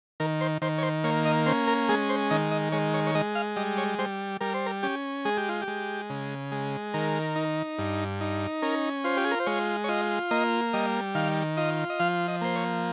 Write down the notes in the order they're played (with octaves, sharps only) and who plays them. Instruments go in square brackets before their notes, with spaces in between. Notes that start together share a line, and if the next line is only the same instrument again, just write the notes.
[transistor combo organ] D#3 A#4
C5
D#3 C5
C#5
C5
A#3 C#5
D#5
C#4 C5
A#4
G#3 G#4
C5
D#3 D#5
D#5
G#3 C#5
C#5
C#5
G#3 D#5
F5
G3 D#5
C#5
G3 C5
G3 A#4
C5
A#4
C#4 G4
G#3 G#4
G4
F4
G4
G#3
C#3
G#3
D#3 A#4
D#4
G2
D#4
C#4 A#4
F4 C5
G4
G#4
A#4
C5
G#3 C#5
C#5
F4 D#5
A#3 D#5
G3 D#5
D#3 F5
F4 D#5
D#5
F3 F5
D#5
A#3 C5
C#5